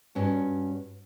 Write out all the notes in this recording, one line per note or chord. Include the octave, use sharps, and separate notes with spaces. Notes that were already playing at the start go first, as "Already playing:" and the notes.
G2 C#4 F#4